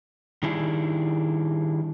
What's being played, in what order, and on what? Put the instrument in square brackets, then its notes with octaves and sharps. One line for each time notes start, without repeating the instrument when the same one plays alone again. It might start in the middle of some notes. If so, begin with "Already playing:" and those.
[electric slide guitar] D#3 G3 D4 E4 G#4